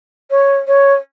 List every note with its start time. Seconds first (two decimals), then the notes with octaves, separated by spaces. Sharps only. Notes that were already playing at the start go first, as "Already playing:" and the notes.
0.31 C#5
0.68 C#5